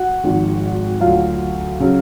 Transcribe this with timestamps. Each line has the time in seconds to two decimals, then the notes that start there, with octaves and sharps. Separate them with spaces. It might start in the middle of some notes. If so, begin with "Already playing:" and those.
Already playing: F#4 F#5
0.24 G#1 G#2 F3
1.01 D2 D3 F#3 F4 F5
1.80 C#3 F#3